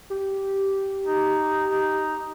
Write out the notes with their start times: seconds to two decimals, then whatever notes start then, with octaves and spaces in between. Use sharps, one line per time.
0.10 G4
1.05 D#4
1.69 D#4